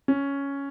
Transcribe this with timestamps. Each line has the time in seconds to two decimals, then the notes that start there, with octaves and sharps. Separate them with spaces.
0.08 C#4